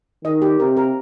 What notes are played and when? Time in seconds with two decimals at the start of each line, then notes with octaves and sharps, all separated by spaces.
0.25 D#3 D#5
0.42 G4
0.60 C3 A#4
0.77 A#4